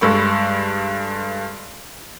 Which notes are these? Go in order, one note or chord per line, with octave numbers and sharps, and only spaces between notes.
G2 G#3 A4 B5 C#6